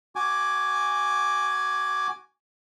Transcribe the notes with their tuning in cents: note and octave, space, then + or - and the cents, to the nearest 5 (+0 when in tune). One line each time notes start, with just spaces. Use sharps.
F#4 +15 G#5 +0 D6 +0